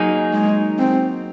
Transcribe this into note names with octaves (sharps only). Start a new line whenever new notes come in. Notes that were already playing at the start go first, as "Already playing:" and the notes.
Already playing: F#3 A#3 D#4 G#4
G#3
C4